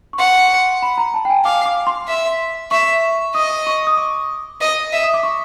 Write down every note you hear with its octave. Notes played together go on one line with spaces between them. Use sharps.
C#6
F#5 C6
B5
A#5
A5
G5
G#5
F5 D6
D6
C6
E5
E5 C#6
D#5 D#6
C#6
D#6
D6
D#5
E5
D#6
D6
C#6